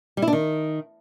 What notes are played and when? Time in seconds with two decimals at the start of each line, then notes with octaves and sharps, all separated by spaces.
0.17 G3
0.22 E4
0.27 D4
0.33 D#3